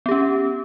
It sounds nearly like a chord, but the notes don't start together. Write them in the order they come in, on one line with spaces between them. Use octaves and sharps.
B3 G4 C#4